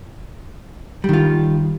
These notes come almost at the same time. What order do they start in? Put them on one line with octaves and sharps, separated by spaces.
G3 D#3 F4